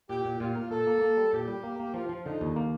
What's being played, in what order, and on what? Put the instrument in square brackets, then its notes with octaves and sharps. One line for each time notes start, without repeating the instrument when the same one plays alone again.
[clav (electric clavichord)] A#2 [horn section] G4
[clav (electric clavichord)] A#2
[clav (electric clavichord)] A#2 [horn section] F4
[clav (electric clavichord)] A#3
[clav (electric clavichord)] A#2 [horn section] A4
[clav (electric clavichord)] A#3
A#3
G3
[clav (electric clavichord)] A#2 [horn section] G4
[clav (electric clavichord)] G3
A#3
A#3
[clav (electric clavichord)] F3 [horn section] F4
[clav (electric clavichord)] F3
[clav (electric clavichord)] D3 [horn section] D#4
[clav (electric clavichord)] D#2
A#3